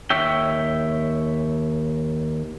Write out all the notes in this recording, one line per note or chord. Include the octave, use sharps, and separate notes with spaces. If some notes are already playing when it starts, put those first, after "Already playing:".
D#2 C#5 E5 G5